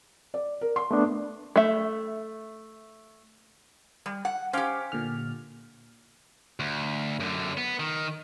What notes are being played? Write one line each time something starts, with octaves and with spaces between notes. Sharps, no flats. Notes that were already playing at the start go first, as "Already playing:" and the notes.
D5
A#4
C6
A3 B3 D4
A3 E5
G3
F#5
C#4 G4 C5 F5 D6
A#2 D3 F6
D2
F#2 D3
B3
D#3